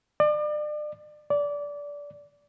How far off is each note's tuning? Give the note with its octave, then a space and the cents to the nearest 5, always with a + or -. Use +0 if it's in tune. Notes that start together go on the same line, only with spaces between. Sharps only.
D5 +35
D5 -20